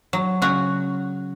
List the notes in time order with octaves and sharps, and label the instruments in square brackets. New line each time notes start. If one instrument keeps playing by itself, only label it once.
[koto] F#3
C#3 F#4